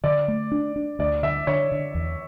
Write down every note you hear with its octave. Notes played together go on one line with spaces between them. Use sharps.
D3 D5
A3
D4
D4
D2 D5
D3 E5
D3 C#5
D3
E2